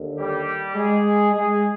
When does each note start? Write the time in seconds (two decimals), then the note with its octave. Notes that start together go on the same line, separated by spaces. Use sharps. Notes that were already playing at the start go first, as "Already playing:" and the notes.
Already playing: D#2 D3
0.18 G3 G4
0.75 G#3 G#4
1.32 G#3 G#4